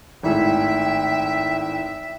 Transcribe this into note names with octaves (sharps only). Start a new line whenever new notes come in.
G#1 A2 G#4 E5 G5